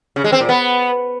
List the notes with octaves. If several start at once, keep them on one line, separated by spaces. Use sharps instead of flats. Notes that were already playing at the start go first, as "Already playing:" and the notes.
C#3
G#3
C4
A#2
B3